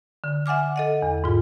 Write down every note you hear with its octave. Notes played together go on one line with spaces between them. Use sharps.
D3
E5 F#5 G#5 D6 F6
A4 D#5 F#5
E2
G#2 F4